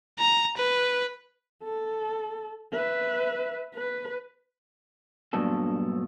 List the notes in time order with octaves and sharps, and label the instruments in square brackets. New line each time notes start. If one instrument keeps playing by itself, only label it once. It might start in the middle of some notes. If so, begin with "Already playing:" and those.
[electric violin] A#5
B4
[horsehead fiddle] A4
B4 E5
B4
[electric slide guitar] G2 A#2 F#3 B3 D4 A4